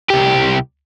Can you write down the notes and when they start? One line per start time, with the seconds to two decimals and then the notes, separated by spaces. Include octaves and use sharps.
0.10 C2 G4